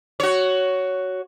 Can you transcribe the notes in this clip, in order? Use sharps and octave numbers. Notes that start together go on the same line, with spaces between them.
F#4 C#5